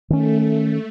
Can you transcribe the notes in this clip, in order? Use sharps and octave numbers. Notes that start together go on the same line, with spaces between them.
D#3 A3 C#4